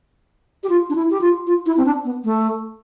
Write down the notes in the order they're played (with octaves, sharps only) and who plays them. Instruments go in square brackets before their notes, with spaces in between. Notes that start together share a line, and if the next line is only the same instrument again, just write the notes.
[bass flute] G4
F4
D4
E4
G4
F4
F4
E4
C4
D4
B3
A3